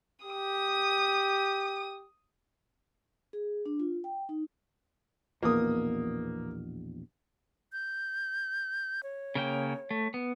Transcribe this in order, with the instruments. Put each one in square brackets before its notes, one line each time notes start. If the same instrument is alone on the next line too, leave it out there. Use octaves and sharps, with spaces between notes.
[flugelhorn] G4 [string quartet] D#6
[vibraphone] G#4
D4
F4
G5
D#4
[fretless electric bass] A#1 E2 B2 [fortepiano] A#3 D#6
[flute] G6
C#5
[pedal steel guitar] C#3 A#3 G5
A3
B3